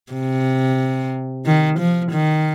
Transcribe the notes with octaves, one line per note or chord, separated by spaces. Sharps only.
C3
D#3
F3
D#3